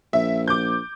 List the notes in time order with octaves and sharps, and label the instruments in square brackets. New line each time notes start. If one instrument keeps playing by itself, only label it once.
[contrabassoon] A#1 [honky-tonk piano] E5
[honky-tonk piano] D6 G6